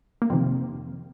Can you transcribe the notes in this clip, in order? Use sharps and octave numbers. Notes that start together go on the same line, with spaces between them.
A#3
F2 C3 D#3 C4